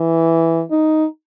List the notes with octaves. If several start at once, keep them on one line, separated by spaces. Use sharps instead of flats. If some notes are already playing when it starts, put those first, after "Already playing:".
Already playing: E3
D#4